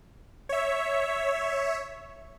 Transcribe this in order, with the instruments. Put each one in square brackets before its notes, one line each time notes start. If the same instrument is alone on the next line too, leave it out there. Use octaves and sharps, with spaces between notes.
[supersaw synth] C#5 E5